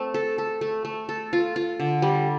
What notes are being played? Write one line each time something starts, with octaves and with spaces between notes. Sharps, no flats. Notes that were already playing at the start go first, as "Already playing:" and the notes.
Already playing: A3 C4
A4
A4
A3
A3
A4
F4
F4
D3
G3